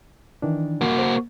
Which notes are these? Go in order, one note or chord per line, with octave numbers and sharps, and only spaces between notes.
D#3 E3 D4
A#3 F#4
A#4 C5